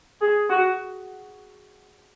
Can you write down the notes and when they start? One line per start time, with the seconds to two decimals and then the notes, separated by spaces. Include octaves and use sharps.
0.21 G#4
0.50 F#4